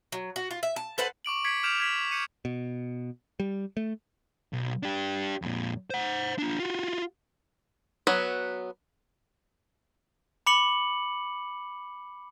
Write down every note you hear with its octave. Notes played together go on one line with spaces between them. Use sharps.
F#3
F#4
F4
E5
A5
A4 B4 C5 F#5
C#6 D6 D7 F#7
D6 G#6 B6 C#7 D7
D6 F6 G6 D7 E7 F7
G#6 B6 F#7
D6 G6 C#7 D#7
B2
G3
A3
B1
D4 G4
F2 A#2
C5 F#5
D4 F4
F4 F#4
F#3 B3
B5 D6 C#7 F#7